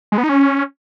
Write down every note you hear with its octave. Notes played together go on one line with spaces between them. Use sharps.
G#3
B3
D#4
C#4